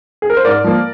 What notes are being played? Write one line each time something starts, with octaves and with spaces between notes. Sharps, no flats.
G#4
A#4
C5
G#2 A#4 D5
F3 A#3